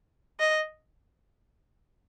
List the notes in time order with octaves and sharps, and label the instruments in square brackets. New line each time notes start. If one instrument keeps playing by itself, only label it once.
[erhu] D#5